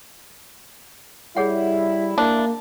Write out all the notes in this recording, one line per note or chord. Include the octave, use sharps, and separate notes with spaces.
G3 E4 G#4 C#5 F#5
A#3 D4